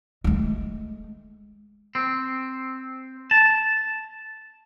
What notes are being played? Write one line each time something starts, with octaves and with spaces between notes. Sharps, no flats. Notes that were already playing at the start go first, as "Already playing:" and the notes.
G#3 A3
C4
A5